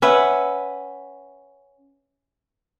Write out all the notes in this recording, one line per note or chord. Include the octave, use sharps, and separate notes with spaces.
C#4 B4 E5 F#5